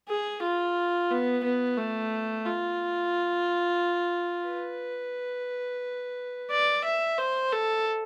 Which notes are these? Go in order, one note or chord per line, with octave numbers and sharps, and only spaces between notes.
G#4
F4
B3
B3
A3
F4
B4
D5
E5
C5
A4